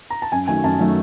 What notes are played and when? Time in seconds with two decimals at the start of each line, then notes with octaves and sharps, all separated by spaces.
0.10 A#5
0.22 A5
0.32 F#2 G#5
0.48 D#3 F#3 A3 G#5
0.64 F#2 A5
0.80 D#3 F#3 A3